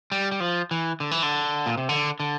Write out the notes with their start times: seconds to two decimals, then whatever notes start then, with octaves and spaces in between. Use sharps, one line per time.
0.12 G3
0.31 G3
0.40 F3
0.71 E3
1.00 D3
1.11 E3
1.23 D3
1.66 A#2
1.77 C3
1.89 D3
2.20 D3